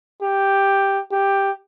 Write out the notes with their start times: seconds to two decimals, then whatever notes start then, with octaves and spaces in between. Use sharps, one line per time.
0.22 G4
1.11 G4